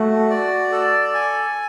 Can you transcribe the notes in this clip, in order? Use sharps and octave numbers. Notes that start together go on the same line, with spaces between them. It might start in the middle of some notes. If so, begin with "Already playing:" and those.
Already playing: A3 F#4
D5
A4
G#5